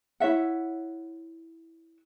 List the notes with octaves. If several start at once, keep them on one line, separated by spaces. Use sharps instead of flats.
E4 C#5 E5 F#5